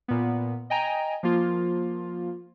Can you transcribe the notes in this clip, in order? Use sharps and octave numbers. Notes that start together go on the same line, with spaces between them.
A#2 B3
D#5 G5 G#5 A#5
F3 A#3 F4